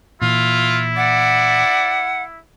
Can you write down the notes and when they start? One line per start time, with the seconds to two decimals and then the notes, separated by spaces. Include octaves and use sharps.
0.22 A#2 E3 E4 F4
0.97 D5 F#5